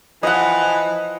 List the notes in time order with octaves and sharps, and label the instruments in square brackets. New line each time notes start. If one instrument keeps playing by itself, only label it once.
[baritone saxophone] E3 [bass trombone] F3 [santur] D#5 F#5